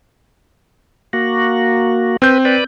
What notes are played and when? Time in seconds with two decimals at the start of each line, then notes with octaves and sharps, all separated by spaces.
1.13 A#3 F#4
2.22 C4 B4 G6
2.45 B4 D5